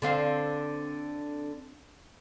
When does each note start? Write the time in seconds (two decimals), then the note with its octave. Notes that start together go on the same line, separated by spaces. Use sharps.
0.02 D3 C4 F5